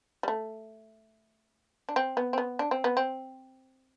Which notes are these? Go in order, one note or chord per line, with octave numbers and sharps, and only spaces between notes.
G3
A3
D4
C4
B3
C4
B3
D4
C4
B3
C4